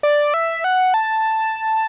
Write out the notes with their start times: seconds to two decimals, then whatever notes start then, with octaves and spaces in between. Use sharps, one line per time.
0.03 D5
0.34 E5
0.64 F#5
0.94 A5